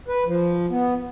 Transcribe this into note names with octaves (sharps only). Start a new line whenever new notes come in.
B4
F3
B3